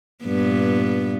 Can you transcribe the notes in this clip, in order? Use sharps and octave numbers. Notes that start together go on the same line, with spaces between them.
G2 A#2 B3